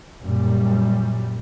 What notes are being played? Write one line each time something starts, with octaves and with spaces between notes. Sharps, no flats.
F#2 A#2 G3